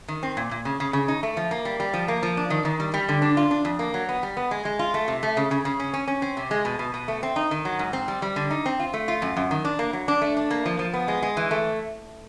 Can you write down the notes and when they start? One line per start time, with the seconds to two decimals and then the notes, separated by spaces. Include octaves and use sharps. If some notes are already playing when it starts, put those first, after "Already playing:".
0.08 D#3
0.23 C4
0.37 A#2
0.51 A#2
0.65 C#3
0.80 C#3
0.93 C#3
1.08 D#4
1.23 A3
1.37 F3
1.51 A#3
1.65 G3
1.80 G3
1.94 F3
2.08 A#3
2.23 F3
2.37 D4
2.50 D#3
2.65 D#3
2.80 G3
2.94 G3
3.09 D3
3.22 D4
3.37 F4
3.51 D4
3.65 F2
3.79 A#3
3.94 F#3
4.09 B3
4.23 G3
4.37 B3
4.51 G#3
4.65 G#3
4.79 F4
4.94 A3
5.08 C3
5.23 A3
5.37 C#3
5.51 C#3
5.65 C#3
5.80 C#4
5.94 C#4
6.08 C#4
6.22 C4
6.37 C3
6.51 G#3
6.65 B2
6.79 B2
6.94 B2
7.08 A3
7.23 C4
7.36 D#4
7.51 D#3
7.65 F#3
7.79 G#2
7.93 C4
8.08 G3
8.22 G3
8.36 D3
8.50 D#4
8.66 C4
8.80 F4
8.94 A3
9.08 F4
9.22 F#2
9.37 F#2
9.51 D#3
9.65 D4
9.79 A#3
9.93 F#3
10.08 D4
10.22 A3
10.37 D4
10.51 A#3
10.66 F3
10.79 F3
10.94 B3
11.08 G#3
11.22 G#3
11.37 E3
11.51 A3